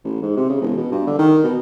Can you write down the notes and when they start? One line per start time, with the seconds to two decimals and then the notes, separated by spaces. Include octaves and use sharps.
0.05 A1
0.22 G#2
0.37 C3
0.49 C#3
0.62 E1
0.77 B2
0.92 G2
1.07 D3
1.19 D#3
1.44 B2